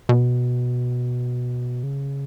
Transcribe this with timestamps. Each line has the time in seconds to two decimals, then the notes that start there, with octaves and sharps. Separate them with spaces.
0.09 B2
1.83 C#3